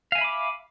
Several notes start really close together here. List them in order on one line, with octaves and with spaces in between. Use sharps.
F5 G#5 E5 B5 D6